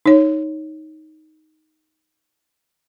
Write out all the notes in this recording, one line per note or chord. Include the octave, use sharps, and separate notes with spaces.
D#4 C#5